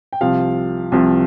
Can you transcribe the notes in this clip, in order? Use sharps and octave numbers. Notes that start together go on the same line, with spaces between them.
G5
C2 C3 F3 F5
C2 C3 F3